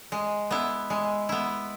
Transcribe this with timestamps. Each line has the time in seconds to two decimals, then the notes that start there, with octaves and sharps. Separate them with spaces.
0.12 G#3
0.51 B3 E4
0.90 G#3
1.29 B3 E4